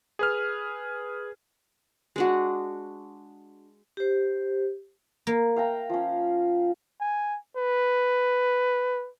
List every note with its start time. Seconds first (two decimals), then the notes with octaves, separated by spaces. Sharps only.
0.19 G#4 B4 F6
2.16 G#3 D4 F#4
3.97 G4 C5
5.27 A#3
5.56 F5 G5 A#5
5.90 F3 C#4
7.01 G#5
7.57 B4